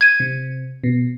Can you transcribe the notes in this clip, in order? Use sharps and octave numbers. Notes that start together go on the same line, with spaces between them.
G#6 D#7
C3
B2